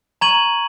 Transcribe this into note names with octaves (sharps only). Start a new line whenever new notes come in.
A#5 C#6 G#6 D#7 F#7